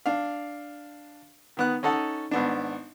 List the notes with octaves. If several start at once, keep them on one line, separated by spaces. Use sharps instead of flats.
D4 F5
D#3 B3 F#6
C#4 D#4 A4 F#5 A5
G#1 B3 D4